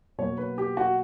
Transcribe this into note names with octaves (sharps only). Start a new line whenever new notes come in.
B2 F#3 A#3 C#5
B4
G4
F#4